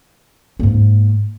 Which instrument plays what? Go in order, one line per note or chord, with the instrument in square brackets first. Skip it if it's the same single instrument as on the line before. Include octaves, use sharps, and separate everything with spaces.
[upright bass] G#2 A#3